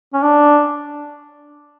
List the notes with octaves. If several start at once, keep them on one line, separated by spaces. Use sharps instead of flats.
C#4
D4